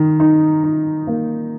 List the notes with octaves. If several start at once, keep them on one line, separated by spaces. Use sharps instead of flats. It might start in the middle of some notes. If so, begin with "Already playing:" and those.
Already playing: D#3
D#4
D#4
A#3